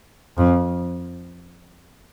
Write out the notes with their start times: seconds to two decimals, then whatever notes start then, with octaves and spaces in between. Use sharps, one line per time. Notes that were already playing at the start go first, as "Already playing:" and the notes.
0.38 F2